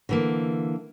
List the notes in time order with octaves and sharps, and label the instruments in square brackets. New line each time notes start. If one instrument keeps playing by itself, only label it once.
[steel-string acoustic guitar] D3 E3 A#3